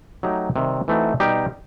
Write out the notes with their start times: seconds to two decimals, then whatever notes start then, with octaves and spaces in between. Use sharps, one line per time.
0.23 F#3 A3 D#4 G4
0.56 C3 D#3 G3
0.88 E3 A3 C4 D#4 F#4
1.20 B2 G3 D#4 G4